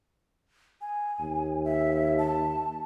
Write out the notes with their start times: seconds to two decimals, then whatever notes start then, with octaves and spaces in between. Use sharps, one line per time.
0.81 G#5
1.20 D#2
1.65 E5
2.18 A5